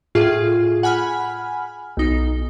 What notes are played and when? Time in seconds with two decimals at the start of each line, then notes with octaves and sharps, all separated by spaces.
0.15 A2 F4 G#4
0.83 F#5 G#5 B5 F6
1.97 B1 D#4